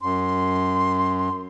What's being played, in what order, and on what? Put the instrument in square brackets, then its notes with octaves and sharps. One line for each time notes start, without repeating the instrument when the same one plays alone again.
[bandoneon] F#2 [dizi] C6